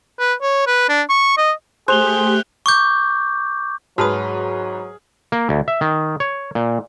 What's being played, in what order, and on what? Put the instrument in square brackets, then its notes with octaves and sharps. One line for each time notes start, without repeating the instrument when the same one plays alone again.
[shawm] B4
C#5
B4
D4
C#6
D#5
[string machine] A3 G4 [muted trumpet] G#4 [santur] C5 [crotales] F#6 F7 G7
[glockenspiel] C#6 D6 G6
[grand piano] G#2 B4 [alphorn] F#3 [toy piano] F#4 A5 D#6 [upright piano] G#4 F6
[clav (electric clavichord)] A#3
D2
E5
D#3
C#5
A#2